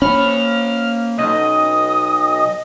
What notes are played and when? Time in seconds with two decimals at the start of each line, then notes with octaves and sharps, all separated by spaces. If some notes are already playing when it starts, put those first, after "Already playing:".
0.02 A#3 C#4 B5 F6
1.18 B1 D#5 D#6